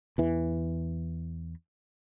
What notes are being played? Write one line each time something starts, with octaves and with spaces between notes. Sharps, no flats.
E2 E3